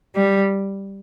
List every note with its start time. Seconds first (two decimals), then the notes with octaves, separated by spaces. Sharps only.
0.15 G3